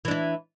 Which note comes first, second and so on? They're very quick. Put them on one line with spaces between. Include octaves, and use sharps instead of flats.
E3 D4 E4